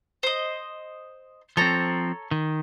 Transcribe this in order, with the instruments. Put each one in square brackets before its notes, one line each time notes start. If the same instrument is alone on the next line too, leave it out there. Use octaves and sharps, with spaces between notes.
[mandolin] C5 D#5
[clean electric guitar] F3 C4 [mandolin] A4 C#5 A#5
[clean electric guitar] D#3